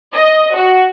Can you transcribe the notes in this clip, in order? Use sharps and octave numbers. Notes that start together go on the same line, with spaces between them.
D#5
F#4